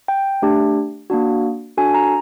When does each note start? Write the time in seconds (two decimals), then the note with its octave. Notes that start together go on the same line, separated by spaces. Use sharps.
0.08 G5
0.42 A3 D4 G4
1.10 A#3 D4 F#4
1.77 D4 F#4 A4 G#5
1.94 A#5